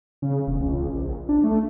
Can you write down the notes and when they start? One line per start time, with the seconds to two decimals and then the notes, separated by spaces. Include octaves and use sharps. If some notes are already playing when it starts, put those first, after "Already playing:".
0.22 C#3
0.47 E1
0.60 C#2
0.94 A#1
1.29 D4
1.44 A3